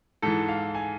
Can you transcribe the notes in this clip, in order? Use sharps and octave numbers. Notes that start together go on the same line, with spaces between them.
G#2 E3 A4
F5
G#5